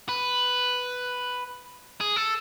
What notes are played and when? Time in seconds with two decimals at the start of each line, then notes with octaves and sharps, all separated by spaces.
0.09 B4
2.01 G#4
2.16 A4